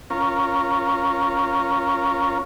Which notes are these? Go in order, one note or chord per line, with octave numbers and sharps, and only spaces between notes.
C#4 F4 A#4